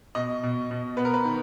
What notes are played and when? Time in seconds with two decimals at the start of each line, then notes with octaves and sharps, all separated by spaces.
0.15 B2 D#5
0.43 B2
0.71 B2
0.97 B3 B4
1.05 A#4
1.14 B4
1.25 D#3